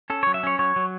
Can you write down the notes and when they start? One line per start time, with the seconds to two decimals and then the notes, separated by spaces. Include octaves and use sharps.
0.10 C#4 A4
0.23 F#3 C#5
0.34 E5
0.43 C#4 C#5
0.59 F#3 C#5
0.76 F#3